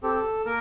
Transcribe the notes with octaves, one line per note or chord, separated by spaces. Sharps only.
C4 G4 A4
A#3 A#4